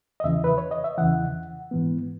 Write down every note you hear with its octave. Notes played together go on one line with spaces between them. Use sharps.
D#5
E2 C#3 E3 E5
B4
C#5
D#5
E5
E2 C#3 E3 F#5
G#2 E3 B3